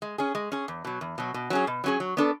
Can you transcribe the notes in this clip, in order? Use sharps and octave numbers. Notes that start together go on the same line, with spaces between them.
G#3
C#4 G#4
G#3
C#4 G#4
E2
B2 F#3
E2
B2 F#3
B2
F#3 C#4 G#4
B2
F#3 C#4 G#4
F#3
B3 D4 A4